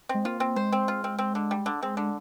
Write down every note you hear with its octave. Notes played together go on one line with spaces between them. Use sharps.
G#3 C4
A#3 F4
C4
G#3 C5
C4
F4
C4
C4
D3
G3
D3
G#3 C4
D3